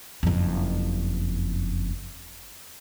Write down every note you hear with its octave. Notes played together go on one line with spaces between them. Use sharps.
F#1 F2